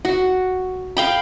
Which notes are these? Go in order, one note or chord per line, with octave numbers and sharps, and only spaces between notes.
F#4
F5 G5 B5